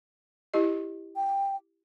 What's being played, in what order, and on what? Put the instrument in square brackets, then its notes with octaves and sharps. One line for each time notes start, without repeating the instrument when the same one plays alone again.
[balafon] E4 G4 D#5
[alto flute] G5